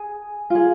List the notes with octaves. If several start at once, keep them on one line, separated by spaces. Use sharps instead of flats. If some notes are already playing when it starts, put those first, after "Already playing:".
Already playing: G#4 G#5
F4 G#4